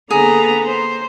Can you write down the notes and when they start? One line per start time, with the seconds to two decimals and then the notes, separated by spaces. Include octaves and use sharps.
0.10 D3 A#3 B3 G#4 A#5
0.65 C5